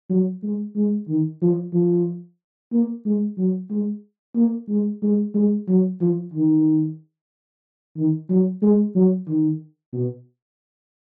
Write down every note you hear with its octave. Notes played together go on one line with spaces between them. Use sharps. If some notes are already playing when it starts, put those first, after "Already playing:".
F#3
G#3
G#3
D#3
F3
F3
A#3
G#3
F#3
G#3
A#3
G#3
G#3
G#3
F#3
F3
D#3
D#3
F#3
G#3
F#3
D#3
B2